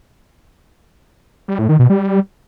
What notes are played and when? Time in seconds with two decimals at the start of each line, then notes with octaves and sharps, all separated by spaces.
1.48 G3
1.59 A2
1.69 D#3
1.79 B2
1.90 G3